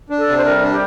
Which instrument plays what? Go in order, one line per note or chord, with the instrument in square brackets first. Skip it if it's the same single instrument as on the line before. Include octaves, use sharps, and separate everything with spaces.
[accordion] D4
[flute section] A4
[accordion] C3
[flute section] C5
[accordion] G3 [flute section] A#4
[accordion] D4
[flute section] G4